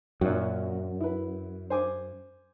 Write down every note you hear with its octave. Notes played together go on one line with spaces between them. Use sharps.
F#2 A#2 F#4
E4 B4
C5 G#5 D6